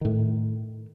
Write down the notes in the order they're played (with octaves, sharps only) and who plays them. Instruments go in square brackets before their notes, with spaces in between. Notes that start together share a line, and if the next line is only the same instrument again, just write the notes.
[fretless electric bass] A2 D#3